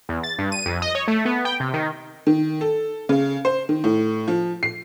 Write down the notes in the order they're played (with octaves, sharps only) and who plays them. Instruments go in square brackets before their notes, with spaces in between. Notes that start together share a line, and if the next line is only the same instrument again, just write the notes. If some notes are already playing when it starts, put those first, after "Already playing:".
[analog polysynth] E2
A6
G2
D#7
F2
D#5
C#5
A3
B3
G5
C3
D#3
[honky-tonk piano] D#3
A4
C#3
C5
D#3
A2
F3
C7